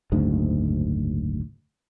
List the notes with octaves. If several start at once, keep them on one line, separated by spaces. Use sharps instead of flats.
F#1 D2 G#2